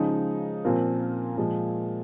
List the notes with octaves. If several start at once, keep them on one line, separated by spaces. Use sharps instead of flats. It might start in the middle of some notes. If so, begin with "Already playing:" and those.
Already playing: C#3 F3 G#3 D#4
A#2 F3 C4 F4 A#4
A#2 F3 G#3